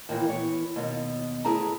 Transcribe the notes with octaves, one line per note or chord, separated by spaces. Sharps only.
D#2 A#2 E3
E3 B3 C#5
D#2 B2
D2 E4 G#4 B4 A5 A#5